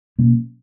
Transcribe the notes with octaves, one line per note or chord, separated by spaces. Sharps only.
B2 F#3 A#3 C#4